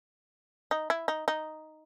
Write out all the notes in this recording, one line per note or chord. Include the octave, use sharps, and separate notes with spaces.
D#4
E4
D#4
D#4